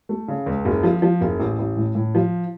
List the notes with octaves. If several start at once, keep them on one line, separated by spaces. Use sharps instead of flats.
A3
C#3
C#2
F#1
F3
F3
F#1
A1
A1
A2
A2
F3